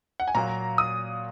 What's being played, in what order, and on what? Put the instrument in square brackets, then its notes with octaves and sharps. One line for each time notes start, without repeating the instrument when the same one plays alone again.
[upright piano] F#5
G#5
[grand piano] A#2 F#3 A#3 [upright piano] A#5
[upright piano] D#6